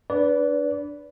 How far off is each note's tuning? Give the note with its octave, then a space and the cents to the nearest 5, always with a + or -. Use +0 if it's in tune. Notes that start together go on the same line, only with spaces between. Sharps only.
D4 +0 B4 +0 D5 -30